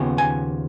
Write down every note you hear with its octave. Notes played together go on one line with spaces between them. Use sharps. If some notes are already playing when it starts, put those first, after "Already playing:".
Already playing: D#2 C#3 F3 B3
G#5